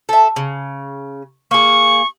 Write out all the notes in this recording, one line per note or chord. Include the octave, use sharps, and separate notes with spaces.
A4 E5
C#3
A#3 G#4 C#6